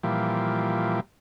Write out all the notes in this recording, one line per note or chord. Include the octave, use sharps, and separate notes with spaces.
A#2 E3 F3 G3